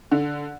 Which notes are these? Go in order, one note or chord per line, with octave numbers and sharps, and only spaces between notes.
D3